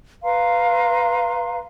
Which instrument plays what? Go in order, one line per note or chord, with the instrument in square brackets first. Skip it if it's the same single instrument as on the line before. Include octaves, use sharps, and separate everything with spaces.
[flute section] B4 F5 A#5 C6